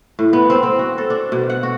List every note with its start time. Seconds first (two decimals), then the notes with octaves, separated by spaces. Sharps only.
0.19 A2
0.33 B3
0.50 C4
0.63 C4
0.79 F#4
0.98 A4
1.10 D4
1.32 B2
1.50 F#5
1.63 F#4